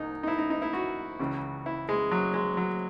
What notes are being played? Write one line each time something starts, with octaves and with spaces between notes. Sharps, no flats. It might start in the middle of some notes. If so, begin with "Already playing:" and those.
Already playing: C2 D#4
D#4
E4
D#4
D#4
E4
F#4
C#2 C#3 E3
E4
G#3
F#3
G#3
F#3